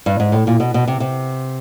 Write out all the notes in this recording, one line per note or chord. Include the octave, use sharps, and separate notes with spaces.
G2
G#2
A2
A#2
B2
B2
C3
C3